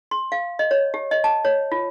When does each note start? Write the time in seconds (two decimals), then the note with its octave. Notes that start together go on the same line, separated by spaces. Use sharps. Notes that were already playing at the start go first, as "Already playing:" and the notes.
0.11 C6
0.32 F5
0.59 D#5
0.71 C#5
0.94 G4
1.11 D#5
1.24 A5
1.45 C#5
1.72 F4